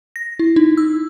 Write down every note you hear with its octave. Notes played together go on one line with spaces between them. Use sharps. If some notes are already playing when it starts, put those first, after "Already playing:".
A#6
E4
D#4
E6